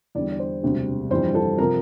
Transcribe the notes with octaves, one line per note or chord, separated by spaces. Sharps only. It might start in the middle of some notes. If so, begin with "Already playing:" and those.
E2 D3 G3 D5
D5
C5
E1 D2 C3 G3
G1 F2 E3 G3 C5
A4
C3 F3 A#4